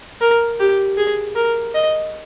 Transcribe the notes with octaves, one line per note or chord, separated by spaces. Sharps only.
A#4
G4
G#4
A#4
D#5